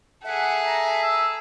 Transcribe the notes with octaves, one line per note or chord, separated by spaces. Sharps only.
G#4 A4 E5 F#5
A#5
E6